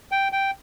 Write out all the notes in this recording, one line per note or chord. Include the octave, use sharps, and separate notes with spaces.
G5
G5